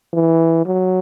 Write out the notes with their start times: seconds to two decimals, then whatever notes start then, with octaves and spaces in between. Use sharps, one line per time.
0.13 E3
0.66 F#3